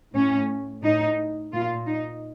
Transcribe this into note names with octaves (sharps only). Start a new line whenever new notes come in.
A2 C#4
A2 D#4
A#2 F4
D#4